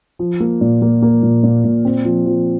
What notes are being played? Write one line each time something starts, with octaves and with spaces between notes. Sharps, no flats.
F3
A#3
A#2
A#3
A#3
A#2
A#2
A#2
C4
F3
F3